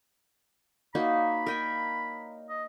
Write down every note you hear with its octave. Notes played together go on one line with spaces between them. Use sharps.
A#3 D#4 F#4 C#5 D5 F5 B5
D#4 A#4 G5 G#5
D#5